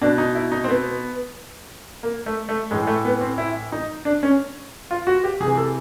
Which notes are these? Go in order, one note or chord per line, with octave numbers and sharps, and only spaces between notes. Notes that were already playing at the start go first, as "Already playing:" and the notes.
B2 D4
D#4
E4
D#4
C4
B3
A#3
A3
A3
A2 E3 G#3
A3
B3
C4
E4
D#4
D4
C#4
F4
F#4
G4
C3 E3 G#4
A4